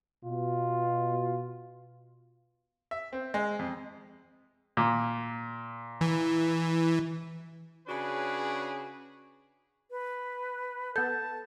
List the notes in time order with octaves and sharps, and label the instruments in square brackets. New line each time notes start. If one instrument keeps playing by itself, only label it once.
[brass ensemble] B2 [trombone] F4
[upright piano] E5
C4
G#3
F2
[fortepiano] A#2
[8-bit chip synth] E3
[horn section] C#3 C#4 D4 F#4 G#4 B4
[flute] B4
[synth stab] B3 A4 [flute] A5 [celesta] G6